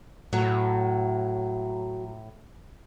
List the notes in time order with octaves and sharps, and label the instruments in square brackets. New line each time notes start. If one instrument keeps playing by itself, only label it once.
[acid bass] A2 [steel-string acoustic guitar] F#3